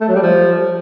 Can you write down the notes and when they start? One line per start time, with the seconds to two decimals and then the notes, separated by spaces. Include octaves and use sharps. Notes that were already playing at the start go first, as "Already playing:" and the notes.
0.01 A3
0.08 F#3
0.15 G3
0.23 F3